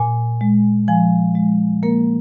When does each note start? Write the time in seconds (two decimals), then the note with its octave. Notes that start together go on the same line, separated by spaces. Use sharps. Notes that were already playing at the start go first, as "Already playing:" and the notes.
Already playing: A#2 G#5
0.41 G#3
0.88 F3 G#5
1.35 G#3
1.83 A#3 A#4